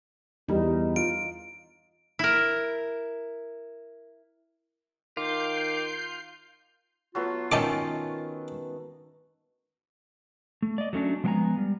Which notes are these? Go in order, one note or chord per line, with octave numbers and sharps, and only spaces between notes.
E2 G2 G3 D#4
F4 D7
E4 A#4
D#3 F4 D6 G6 C7
F#3 A3 B3 F4
D#3 C#4 D#4 A5 D6
A3
D5 D#5
F#3 A3 C#4 D4
F3 G#3 B3 F#5 G#5 A#5
G3